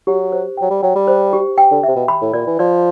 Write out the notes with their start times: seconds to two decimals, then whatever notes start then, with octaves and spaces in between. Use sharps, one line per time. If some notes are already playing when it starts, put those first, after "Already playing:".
0.07 F#3 G4
0.32 C5
0.57 F#3 G5
0.70 G3
0.83 F#3 G5
0.95 G3
1.08 C5
1.33 G4
1.58 G5
1.71 D3
1.83 C3 E5
1.96 B2
2.08 B5
2.21 A2
2.34 A#2 D5
2.47 E3
2.59 F3 D5